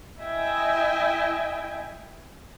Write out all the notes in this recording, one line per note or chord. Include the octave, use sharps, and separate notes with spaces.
E4 D#5 E5 G5 G#5